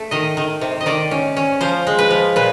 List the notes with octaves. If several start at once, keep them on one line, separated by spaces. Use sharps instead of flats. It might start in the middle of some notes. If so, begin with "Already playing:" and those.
Already playing: A3
D#3 D#5
D#3
C3
D#5
D#3 D5
C#4
C#4
F3 C5
G#3
B4
F3
A#2 B4